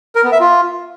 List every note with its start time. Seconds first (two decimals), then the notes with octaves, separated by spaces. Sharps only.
0.15 A#4
0.24 B3
0.32 E5
0.40 F4